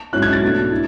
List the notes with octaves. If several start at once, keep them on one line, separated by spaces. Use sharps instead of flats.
G#2 F#3 C#4 E4 F#6
G#6
A6
B2 A3 D4
E4